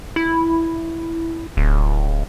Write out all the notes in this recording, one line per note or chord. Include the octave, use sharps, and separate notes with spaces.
E4
D1